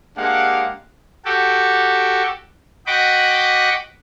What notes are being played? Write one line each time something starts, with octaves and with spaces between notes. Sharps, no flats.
G#3 A#3 D4 G4 F5 F#5
F#4 G4 A4
F#4 D#5 F#5 G5 B5 D6